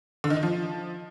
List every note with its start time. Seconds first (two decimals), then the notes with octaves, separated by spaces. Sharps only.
0.24 D3
0.30 D#3
0.36 D#4
0.43 F3